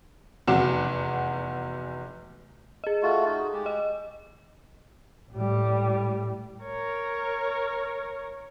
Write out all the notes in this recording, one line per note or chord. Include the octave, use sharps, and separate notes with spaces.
F1 E2 F#4 F#5 D6 E7
G#4 D#5
A3 F4 F#4
D#4 F#4
G#3 G4
D#5
A2 G3
A#4 C#5